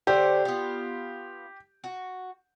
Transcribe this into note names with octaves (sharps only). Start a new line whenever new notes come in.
D3 A3 G4 C5
B3 F4
F#4